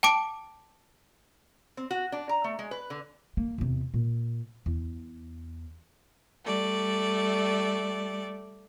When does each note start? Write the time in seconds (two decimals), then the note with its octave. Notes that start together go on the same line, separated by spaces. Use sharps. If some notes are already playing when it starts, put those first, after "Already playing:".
0.03 G5 A5 D6 D7
1.77 C4
1.91 F#4
2.12 D4
2.29 A#5
2.44 A3
2.59 G#3
2.71 B4
2.90 D3
3.37 A#3
3.58 E2 C3
3.94 A#2
4.66 E2
6.45 G3 A3 D5